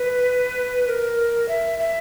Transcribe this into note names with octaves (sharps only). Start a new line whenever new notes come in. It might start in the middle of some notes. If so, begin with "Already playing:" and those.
Already playing: B4
A#4
E5
E5